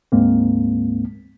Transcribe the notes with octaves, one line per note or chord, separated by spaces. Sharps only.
D2 G#2 G#3 A#3 C4